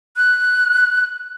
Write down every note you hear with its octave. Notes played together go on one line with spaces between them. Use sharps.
F#6